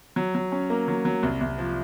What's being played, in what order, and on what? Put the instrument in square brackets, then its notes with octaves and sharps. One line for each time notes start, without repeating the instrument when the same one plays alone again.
[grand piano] F#3
F#3
C#4
A#3
F#3
F#3
C2
C2
F3